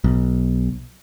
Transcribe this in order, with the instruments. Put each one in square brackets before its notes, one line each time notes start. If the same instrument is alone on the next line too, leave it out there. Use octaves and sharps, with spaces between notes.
[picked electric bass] B1